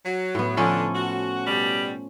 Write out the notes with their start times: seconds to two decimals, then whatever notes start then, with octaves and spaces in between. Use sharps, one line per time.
0.05 F#3
0.35 A2 B3
0.57 D3 F3 C#4 A4
0.95 F#4
1.47 B2 G3